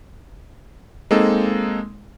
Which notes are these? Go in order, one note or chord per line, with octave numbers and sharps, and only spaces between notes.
G#3 A#3 C4 D#4 A4